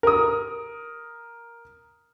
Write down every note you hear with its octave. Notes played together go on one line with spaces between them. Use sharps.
A#4 D#6